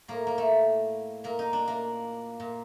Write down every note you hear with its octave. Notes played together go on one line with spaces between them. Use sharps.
A2 A#3
A#3
A3
A#2 A#3
D#4
D4
A#3
A#2